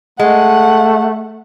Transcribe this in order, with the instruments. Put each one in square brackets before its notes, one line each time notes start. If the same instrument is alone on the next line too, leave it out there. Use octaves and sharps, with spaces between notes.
[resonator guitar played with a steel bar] G#3 [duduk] A3 [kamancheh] F#5